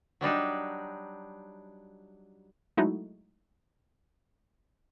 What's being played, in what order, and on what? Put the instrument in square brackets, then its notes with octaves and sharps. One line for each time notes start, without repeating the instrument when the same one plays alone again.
[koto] F#3 G3 D4 D#4
[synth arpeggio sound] F#3 G#3 A3 D#4 E4 F#4